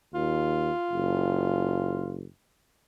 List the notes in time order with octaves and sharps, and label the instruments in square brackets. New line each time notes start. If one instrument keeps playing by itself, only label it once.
[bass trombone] D#2 [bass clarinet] F4
[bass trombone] F#1